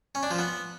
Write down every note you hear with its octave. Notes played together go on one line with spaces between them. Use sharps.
C#4
D4
F3
B3